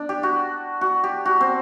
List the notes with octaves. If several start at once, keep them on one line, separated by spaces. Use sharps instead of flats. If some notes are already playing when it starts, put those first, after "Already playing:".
Already playing: D4
G4
F#4
F#4
G4
F#4
C4